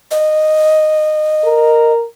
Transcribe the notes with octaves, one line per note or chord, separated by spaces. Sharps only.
D#5
A#4